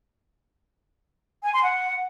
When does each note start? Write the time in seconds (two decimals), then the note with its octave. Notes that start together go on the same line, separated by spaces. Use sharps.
1.43 G#5
1.52 C6
1.62 F#5